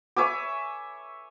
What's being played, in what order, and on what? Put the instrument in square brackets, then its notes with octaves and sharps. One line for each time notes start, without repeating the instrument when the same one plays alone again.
[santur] C#5 E5 G#5 D6